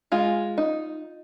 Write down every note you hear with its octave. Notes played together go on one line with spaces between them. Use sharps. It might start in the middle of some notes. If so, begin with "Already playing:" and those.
G#3 F4
D#4